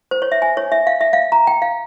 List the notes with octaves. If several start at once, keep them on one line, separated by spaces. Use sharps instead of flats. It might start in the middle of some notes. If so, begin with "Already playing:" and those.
C5
C#5
E5
G#5
C#5
E5
F5
E5
F5
A#5
G5
F5